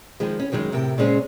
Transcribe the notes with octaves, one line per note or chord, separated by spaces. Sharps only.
D#3 F3 G#3
C#4
F#2 D#3 F#3 G#3
A2 C3 A#4 G5
A#2 C#3 G#3 C#4 C5